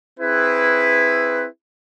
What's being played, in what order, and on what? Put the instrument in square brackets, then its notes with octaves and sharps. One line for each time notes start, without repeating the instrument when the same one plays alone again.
[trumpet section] C4 E4 G#4 B4